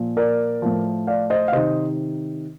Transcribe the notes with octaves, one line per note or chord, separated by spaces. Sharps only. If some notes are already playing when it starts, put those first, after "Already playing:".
Already playing: A#2 F3
A#4 D5
A2 F3
D5 F5
C5 D#5
F5
C3 D#3 C5 D#5